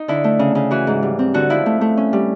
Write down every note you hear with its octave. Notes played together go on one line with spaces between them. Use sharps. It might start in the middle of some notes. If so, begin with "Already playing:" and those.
Already playing: D#4
D3 E4
A3
C#3
C#3
E3 F#4
G#2
G3
C4
D3 F#4
F3 E4
A3
A3
C#4
G3